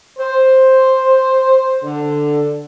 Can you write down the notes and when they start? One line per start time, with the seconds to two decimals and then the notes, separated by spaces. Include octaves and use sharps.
0.18 C5
1.83 D3